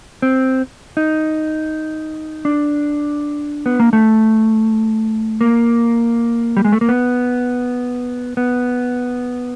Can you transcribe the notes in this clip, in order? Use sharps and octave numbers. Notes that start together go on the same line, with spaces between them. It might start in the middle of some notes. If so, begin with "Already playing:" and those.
C4
D#4
D4
B3
A#3
A3
A#3
G3
G#3
A3
A#3
B3
B3